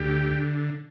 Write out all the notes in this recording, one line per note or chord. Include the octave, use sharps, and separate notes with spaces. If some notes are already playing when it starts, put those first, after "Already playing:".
Already playing: D2 G4
D3